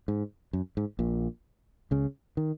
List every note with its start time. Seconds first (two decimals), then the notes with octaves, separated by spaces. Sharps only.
0.08 G#2
0.53 F#2
0.77 G#2
0.99 A#1 A#2
1.91 C#2 C#3
2.37 D#3